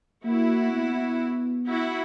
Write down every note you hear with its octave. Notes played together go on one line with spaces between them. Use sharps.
A#3 E4 F#4
B3
E4 F#4